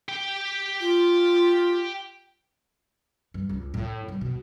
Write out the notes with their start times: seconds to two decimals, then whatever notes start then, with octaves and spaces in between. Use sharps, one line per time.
0.09 G4 G5
0.81 F4
3.34 G2
3.49 C#2
3.74 A2
4.08 G2
4.21 B2